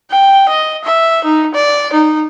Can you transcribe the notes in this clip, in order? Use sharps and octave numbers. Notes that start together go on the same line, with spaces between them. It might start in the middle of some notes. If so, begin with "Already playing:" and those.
G5
D#5
E5
D#4
D5
D#4